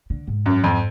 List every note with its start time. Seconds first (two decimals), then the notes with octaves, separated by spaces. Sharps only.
0.10 D3
0.28 G#2
0.46 F#2
0.64 F2